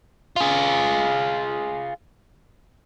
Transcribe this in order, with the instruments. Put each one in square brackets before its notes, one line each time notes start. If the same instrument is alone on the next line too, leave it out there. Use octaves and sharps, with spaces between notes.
[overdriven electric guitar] F4 G#4